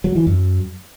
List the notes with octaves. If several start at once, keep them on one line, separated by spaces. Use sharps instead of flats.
F#3
E3
F#2